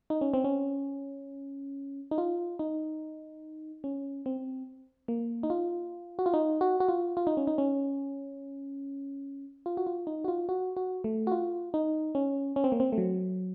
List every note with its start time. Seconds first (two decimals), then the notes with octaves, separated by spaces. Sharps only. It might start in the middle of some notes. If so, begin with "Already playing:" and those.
0.10 D#4
0.21 C#4
0.34 C4
0.44 C#4
2.11 D#4
2.18 F4
2.59 D#4
3.84 C#4
4.26 C4
5.08 A#3
5.43 D#4
5.50 F4
6.19 F#4
6.26 F4
6.34 D#4
6.61 F#4
6.80 F#4
6.89 F4
7.17 F4
7.27 D#4
7.37 C#4
7.47 D#4
7.58 C#4
9.66 F4
9.77 F#4
9.87 F4
10.07 D#4
10.24 F#4
10.28 F4
10.49 F#4
10.77 F#4
11.04 A3
11.27 F#4
11.32 F4
11.74 D#4
12.15 C#4
12.56 C#4
12.64 C4
12.72 A#3
12.80 C4
12.93 A3
12.98 F#3